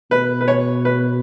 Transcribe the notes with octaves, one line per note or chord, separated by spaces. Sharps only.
B2 B4
B4
C#5
B4